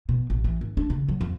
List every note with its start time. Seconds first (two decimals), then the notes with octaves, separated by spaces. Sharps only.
0.09 B2
0.30 A1
0.44 E3
0.61 G#1
0.77 D4
0.90 C#3
1.09 F#3
1.21 F2